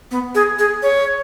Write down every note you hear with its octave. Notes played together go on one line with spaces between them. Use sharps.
B3
G#4
G#4
C#5